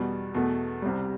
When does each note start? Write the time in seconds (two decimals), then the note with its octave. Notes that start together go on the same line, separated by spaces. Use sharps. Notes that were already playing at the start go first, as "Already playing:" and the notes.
Already playing: E2 B2 G3
0.34 E2 B2 A3
0.82 C2 C3 G3